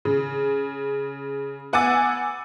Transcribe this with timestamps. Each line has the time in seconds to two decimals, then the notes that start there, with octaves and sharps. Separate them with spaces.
0.05 C#3
1.73 B3 F#5 G#5 D6 E6 A6